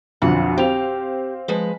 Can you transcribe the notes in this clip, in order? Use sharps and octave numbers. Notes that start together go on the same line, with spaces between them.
B1 F2 D3 F#5
C4 G4 F5 F7
F3 G#3 B4